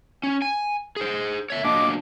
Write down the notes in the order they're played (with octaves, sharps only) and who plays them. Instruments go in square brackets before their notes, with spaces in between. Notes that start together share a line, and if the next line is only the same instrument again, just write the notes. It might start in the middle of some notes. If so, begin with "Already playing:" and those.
[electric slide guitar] C#4
G#5
G#4 C5
C#5 E5
[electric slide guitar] F#3 A#3 D4 [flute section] D#5 D6